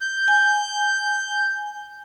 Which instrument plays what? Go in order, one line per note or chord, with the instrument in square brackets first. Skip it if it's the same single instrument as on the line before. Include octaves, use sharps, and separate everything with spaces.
[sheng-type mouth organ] G6
[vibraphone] G#5